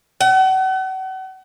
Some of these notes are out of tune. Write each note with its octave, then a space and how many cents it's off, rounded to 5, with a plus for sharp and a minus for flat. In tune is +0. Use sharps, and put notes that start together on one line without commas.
F#5 +40